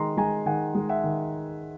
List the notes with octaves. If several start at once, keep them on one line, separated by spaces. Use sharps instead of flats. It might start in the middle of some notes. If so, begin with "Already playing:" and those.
Already playing: D#3 G#3 A#5 C6
G#3 G#5 A#5
D#3 F#5 G#5
G#3
E5 F#5
D#3